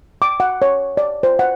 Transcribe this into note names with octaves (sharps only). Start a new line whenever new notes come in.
D6
F#5
C#5
D5
C5
F#5